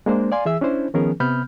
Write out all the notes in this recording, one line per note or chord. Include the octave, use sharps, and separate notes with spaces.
G#3 A#3 D4 C5
D5 F5 G#5 C6
E3 G#4 E5 E6
C#4 D4 E4 C5
D#3 F3 B3 C#4 G#4 A#4
C3 B3 B5 F6 G6